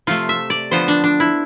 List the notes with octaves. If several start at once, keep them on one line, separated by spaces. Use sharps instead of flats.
C3 F3 A3 F4
E5
D5
D3 F3 B3 C5
D4
D4
E4